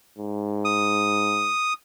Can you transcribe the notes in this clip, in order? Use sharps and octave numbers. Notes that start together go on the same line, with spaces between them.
G#2
D#6